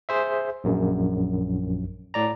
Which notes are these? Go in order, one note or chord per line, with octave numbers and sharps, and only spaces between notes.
G#4 C5 E5
A#1 F#2
A2 D5 A#5